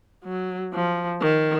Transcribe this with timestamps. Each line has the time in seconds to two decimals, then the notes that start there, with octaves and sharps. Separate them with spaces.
0.24 F#3
0.73 F3
1.21 D#3